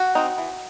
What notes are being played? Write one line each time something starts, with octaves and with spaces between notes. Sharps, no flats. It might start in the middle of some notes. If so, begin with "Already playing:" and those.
Already playing: F#4
C4 D#4
E3